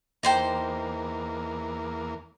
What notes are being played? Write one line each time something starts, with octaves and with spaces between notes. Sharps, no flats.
E2 A#3 D#4 C5 G5